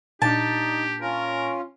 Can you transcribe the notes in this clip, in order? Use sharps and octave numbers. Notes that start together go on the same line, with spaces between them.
A#2 D4 D#4 G4 A5
C#4 F4 A#4